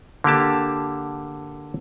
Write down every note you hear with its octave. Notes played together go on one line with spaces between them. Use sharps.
D3 A#3 G4 A5